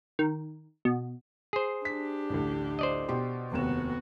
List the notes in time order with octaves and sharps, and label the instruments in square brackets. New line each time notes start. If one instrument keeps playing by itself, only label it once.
[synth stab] D#3
B2
[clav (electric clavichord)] G#4 C5
[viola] D4 G4 [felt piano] B6
[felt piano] A1 D2
[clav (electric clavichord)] C5 D5 D#5
[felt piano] B2 G4 C6
[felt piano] F1 D#2 E7 [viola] B3 F#4